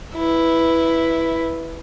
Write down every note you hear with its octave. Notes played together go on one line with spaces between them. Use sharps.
E4 B4